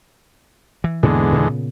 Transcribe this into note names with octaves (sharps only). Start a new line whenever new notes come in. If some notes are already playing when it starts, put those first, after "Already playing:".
E3
E2 G#2 B2 D3 G#3 A#3
A#2 C#3 B3